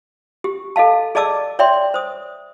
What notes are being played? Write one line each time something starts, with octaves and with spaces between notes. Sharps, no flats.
G4
A4 D#5 F5 A5
G#4 D5 D#5 A5 D6 E6
C#5 D5 E5 G5 C6
C5 D#6